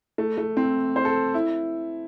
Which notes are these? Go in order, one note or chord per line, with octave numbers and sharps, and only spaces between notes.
A3
A3
C4
C5
A4
E4